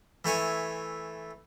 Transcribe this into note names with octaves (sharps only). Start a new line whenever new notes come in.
E3 A3 C#5 G#5